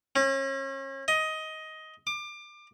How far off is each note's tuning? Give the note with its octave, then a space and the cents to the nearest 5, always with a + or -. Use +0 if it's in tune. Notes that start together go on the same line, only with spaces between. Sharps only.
C#4 -35
D#5 +15
D6 +25